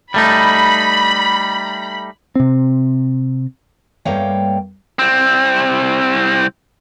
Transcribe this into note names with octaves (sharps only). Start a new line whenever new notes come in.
G3 A3 D#4 B5
C3 C4
G2 A3 A#3 C#5 F5 G5
C2 C4